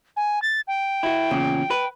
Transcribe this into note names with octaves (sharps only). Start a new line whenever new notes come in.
G#5
A6
G5
E4 F#4
E2 A#2 C#3
B4